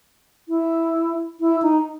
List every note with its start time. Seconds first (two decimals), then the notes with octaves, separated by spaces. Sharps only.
0.49 E4
1.40 E4
1.62 D#4